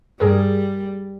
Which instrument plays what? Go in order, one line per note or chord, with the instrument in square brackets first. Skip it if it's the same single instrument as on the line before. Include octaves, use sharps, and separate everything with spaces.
[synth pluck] G2 G#4 A#4 [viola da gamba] G3